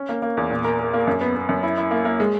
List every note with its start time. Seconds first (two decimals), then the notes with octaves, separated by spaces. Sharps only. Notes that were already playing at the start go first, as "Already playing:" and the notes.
Already playing: C#4
0.09 A#3
0.22 A#3
0.37 E2
0.50 A#2
0.64 A#4
0.79 A#4
0.93 A#3
1.07 F#2
1.21 B3
1.35 B3
1.49 F#2
1.63 E4
1.78 E4
1.91 A#3
2.05 A#3
2.20 G#3